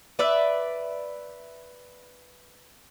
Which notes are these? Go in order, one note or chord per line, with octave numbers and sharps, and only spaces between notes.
B4 D5 E5